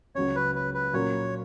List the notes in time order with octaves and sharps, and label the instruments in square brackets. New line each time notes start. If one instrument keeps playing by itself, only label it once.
[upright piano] C#2 C#3 F#3 C#4 [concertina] C#5
[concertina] B4
B4
B4
[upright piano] A#2 F#3 A#3 C#4 [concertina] C#5